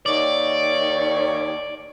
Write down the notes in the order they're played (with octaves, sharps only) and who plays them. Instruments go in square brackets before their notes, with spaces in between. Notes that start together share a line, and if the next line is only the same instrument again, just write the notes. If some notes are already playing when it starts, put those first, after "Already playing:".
[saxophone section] D#2 D#3 C#5 [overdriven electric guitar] D5